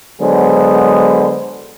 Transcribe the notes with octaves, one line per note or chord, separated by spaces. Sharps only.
D3 F#3 G#3 B3 G#4 C5